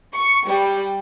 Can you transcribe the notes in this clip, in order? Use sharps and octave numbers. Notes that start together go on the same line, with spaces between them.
C#6
G3